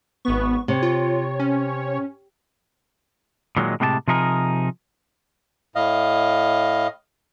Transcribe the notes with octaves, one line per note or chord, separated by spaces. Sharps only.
G#1 B3 C#6
C3 C#5
F4
C#4
A#2 D#3 F#3 G#3
A2 C3 G#3 G4 A#4 A5
C3 F3 D#4 G#4 A#4
A2 D#5 F5